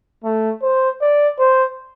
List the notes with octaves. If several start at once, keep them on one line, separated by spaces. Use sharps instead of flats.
A3
C5
D5
C5